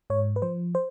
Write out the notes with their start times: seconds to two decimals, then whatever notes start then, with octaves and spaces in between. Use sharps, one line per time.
0.10 G#2 C#5
0.36 B4
0.42 F3 C5
0.75 C5